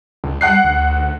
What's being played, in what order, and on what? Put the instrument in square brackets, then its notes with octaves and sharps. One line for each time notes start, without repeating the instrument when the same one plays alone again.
[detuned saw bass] C#2
[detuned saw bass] G3 [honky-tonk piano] F#5 F#6 C7
[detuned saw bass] D2